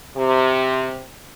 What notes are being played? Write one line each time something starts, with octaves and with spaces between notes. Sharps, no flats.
C3